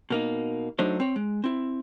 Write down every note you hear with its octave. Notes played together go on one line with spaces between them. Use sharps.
B2 A#3 D#4
F#3 A3 D4 D#4 C5 C#5
C4 C#5
G#3
C4 E4